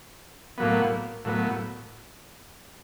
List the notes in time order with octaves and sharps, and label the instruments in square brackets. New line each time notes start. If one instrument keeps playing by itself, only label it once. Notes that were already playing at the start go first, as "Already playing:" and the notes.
[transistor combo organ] A2 F#3 B3 [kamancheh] A#3
[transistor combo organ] A2 F#3 B3 [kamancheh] A#3